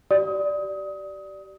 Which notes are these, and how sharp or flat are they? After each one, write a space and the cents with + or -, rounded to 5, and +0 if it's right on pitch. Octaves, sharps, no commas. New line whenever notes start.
G4 -35 D5 +0 D#6 +25